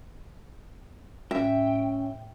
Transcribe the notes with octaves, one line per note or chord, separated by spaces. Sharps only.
A2 C#4 E5 G5